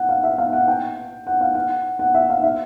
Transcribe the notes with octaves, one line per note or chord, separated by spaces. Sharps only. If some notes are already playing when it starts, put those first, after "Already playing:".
Already playing: F#5
F5
E5
F5
F#5
G5
F#5
F5
F#5
F#5
E5
F5
E5